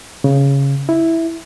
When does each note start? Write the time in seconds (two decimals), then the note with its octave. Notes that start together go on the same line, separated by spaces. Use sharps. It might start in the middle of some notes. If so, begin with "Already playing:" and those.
0.24 C#3
0.89 E4